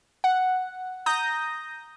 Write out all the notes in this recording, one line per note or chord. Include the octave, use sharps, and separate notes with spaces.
F#5
A#5 D#6 G6 A#6